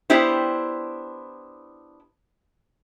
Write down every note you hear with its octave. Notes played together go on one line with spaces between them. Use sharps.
B3 D4 E4 G4 C5